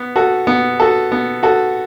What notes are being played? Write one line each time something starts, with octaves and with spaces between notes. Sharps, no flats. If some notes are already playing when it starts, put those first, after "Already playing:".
Already playing: B3
F#4 A4
B3
F#4 A4
B3
F#4 A4